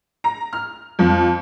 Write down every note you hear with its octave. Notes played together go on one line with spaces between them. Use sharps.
A#5
F6
F2